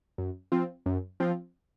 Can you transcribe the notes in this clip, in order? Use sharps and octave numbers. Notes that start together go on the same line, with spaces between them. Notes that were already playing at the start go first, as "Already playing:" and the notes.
F#2
F3 C4 F4
F#2
F3 C4 F4